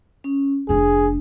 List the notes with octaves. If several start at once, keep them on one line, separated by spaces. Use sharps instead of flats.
C#4
F1 A3 D4 G#4